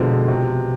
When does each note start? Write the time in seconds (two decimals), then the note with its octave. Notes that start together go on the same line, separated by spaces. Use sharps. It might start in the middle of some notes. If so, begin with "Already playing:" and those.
Already playing: G1 F2 B2 D3 F3 G#3
0.28 C3